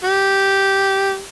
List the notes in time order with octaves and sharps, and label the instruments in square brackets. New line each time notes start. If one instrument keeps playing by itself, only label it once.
[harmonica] G4